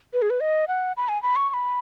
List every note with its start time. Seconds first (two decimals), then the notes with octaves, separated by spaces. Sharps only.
0.14 B4
0.22 G#4
0.30 B4
0.41 D#5
0.68 F#5
0.97 B5
1.08 G#5
1.23 B5
1.36 C#6
1.49 C#6
1.54 B5